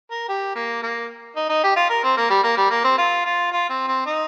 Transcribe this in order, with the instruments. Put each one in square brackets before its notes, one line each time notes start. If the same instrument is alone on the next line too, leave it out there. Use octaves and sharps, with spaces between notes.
[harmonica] A#4
G4
A#3
A#3
D#4
D#4
G4
F4
A#4
C4
A#3
G3
A#3
G3
A#3
C4
F4
F4
F4
C4
C4
D#4